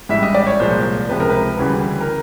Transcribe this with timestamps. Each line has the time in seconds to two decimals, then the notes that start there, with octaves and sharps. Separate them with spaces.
0.09 A1 G#2 E3 G3 E5
0.23 D#5
0.34 D5
0.47 C#5
0.60 C2 A#2 F3 G#3 C5
1.09 C#2 C3 F3 G#3 B4
1.20 A#4
1.30 B4
1.59 D2 C#3 E3 G3
2.01 A#4